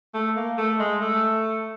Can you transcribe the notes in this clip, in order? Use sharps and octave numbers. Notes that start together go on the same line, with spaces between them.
A3
A#3
A3
G#3
A3